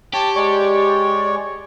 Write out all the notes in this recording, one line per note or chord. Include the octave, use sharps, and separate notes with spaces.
G4 C#5 A5
G#3 C#5 D5 C#6